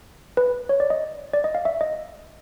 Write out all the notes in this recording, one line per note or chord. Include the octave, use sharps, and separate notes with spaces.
B4
C#5
D5
D#5
D5
D#5
F5
E5
D#5